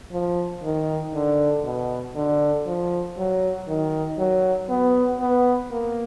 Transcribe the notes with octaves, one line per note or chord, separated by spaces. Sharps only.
F3
D#3
D3
B2
D3
F3
F#3
D#3
F#3
B3
B3
A#3